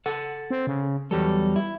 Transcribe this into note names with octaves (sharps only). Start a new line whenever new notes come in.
A4 F#5
C4
C#3
E2 F#3 G3 A4
E4